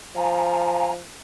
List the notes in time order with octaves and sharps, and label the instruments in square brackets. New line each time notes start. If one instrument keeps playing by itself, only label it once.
[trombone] F3 [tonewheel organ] F5 G#5 A#5